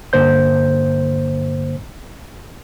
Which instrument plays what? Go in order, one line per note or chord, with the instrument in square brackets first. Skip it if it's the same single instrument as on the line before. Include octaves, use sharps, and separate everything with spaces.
[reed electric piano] G2 D3 A#3 C5 G6